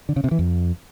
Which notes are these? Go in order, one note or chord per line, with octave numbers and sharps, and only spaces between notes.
D3
C#3
C3
E3
F2